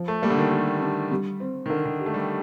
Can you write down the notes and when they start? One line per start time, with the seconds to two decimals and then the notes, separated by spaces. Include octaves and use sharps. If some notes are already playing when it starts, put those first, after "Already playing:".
Already playing: F3
0.08 A3
0.22 G3 A#3
0.30 D3
0.37 D#3
0.51 D#3 G4
0.82 D4
1.11 G3
1.40 C4
1.66 D#3
1.70 D3 A#4
1.85 D#3
2.00 G4
2.06 A3
2.14 G3